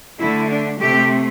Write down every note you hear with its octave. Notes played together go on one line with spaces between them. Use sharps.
D3 A3 E4
D4
C3 A3 G4